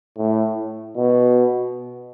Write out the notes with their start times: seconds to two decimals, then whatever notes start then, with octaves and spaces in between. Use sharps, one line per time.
0.18 A2
0.97 B2